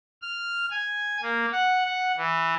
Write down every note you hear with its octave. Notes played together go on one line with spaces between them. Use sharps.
F6
G#5
A#3
F#5
F#5
E3